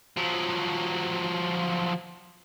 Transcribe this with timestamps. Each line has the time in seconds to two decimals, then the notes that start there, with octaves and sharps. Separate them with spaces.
0.17 F3 F#3